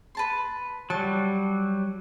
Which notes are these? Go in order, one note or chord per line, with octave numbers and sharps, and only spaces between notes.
B4 A5 C6
F#3 G3 A5